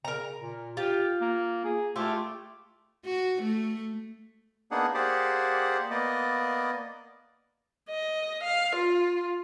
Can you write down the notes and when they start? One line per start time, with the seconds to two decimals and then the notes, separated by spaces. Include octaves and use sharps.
0.05 C#3 A#4 A#5
0.42 A#2
0.77 F4 G4
1.21 A#3
1.65 G#4
1.96 A3 E4 F4 G4
3.05 F#4
3.42 A3
4.71 A#3 B3 D4 D#4 G#4 F#5
4.94 A#3 G4 G#4 C5 D5 F#5
5.91 A#3 B3 D5 D#5
7.90 D#5
8.44 F5
8.76 F4